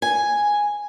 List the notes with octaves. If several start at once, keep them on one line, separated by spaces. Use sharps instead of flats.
G#5